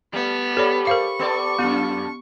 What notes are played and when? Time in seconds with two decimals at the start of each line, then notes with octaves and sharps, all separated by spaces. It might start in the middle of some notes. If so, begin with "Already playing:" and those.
0.13 G3 A3 B3
0.57 G4 A4 C#5 D5 B5
0.87 A#4 C5 F5 C#6
1.19 B3 A4 D5
1.59 F#2 B3 F4